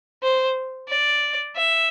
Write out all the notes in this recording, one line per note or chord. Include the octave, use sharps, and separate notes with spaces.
C5
D5
E5